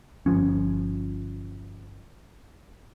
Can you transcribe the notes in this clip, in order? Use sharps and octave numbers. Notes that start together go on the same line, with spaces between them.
G1 F3 C#4